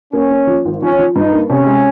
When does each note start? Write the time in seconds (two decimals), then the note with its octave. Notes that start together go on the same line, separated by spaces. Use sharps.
0.13 A#3 C#4
0.31 A#3
0.47 F3
0.65 G#1
0.82 F3 C#4
0.99 F3
1.16 G2 D#4
1.33 A#3
1.50 C3 C#4
1.67 G#3